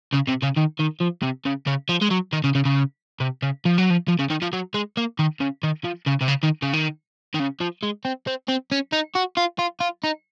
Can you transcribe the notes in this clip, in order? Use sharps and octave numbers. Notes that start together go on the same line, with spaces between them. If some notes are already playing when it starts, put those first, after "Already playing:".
C#3
C3
C#3
D#3
D#3
F3
C3
C#3
C#3
F3
G#3
F#3
D#3
C#3
C#3
C#3
C3
C#3
F3
F#3
F3
F3
C#3
D#3
F3
F#3
G#3
A#3
D#3
C#3
D#3
F3
C#3
C3
C#3
D#3
C#3
D#3
D#3
C#3
F3
G#3
C4
C4
C4
C#4
D#4
F#4
F4
F4
F4
D#4